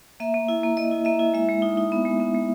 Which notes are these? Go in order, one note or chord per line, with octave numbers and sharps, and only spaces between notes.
A#3 E5
A#3
E4
A#3
A#3 D#5
E4
A#3 E5
E4
G#3 E5
G#3
D#4
D#4
B3
G#3
B3
G#3